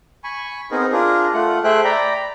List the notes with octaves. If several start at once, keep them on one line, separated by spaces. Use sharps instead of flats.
G#5 B5 C#6
B3 C4 D#4 G#4 A#4
D4 F4 G#4 A#4
A3 F4 F#5
A3 G#4 C5 E5 G5 F#6
D5 G5 A#5 B5